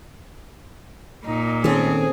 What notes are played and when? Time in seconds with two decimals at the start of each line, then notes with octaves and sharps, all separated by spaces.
1.26 A#2 D#4
1.64 D#3 C4 C#4 G#4 A4